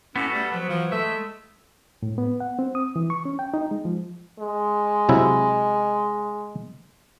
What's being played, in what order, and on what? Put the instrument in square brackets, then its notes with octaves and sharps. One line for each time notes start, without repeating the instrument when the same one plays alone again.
[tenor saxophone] A2 [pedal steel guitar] B3 F#4 A4 [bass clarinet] C#4
[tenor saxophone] G3 [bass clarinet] A3
[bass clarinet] F3 [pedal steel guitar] F#3 [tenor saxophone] B3
[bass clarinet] E3 [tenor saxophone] F3
[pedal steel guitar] G#3 A3 [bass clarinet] A4 [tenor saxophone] E5
[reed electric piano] A2
B3
F#5
C4
D#6
E3
C#6
C#4
G5
D#4
G#3
F3
[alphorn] G#3
[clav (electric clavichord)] C3 F#3 E4